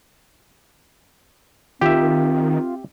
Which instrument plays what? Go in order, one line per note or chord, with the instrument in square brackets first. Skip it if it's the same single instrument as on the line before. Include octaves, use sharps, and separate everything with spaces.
[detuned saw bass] D#3 [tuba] C4 [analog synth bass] F4 [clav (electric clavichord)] G4 E5